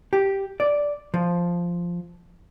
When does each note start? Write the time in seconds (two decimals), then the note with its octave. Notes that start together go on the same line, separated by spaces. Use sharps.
0.13 G4
0.60 D5
1.14 F3